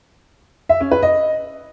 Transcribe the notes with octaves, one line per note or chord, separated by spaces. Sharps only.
E5
C#4
B4
D#5